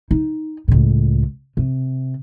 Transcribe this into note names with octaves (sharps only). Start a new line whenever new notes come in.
D#4
C#2 A2
C3